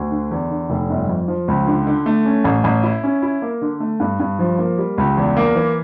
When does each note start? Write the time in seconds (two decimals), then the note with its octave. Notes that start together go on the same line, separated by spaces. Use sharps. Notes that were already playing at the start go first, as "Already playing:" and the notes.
Already playing: D2
0.11 D3
0.31 E2
0.50 D3
0.70 F1
0.90 G1
1.08 F2
1.28 F3
1.48 C#2
1.67 D3
1.87 D3
2.06 A3
2.25 C#4
2.44 A1
2.64 A1
2.83 E4
3.03 C#4
3.22 E4
3.42 A#3
3.61 D3
3.80 A3
4.00 G2
4.20 G2
4.39 F3
4.58 A#3
4.78 G3
4.98 C#2
5.17 E2
5.37 A#3
5.55 E3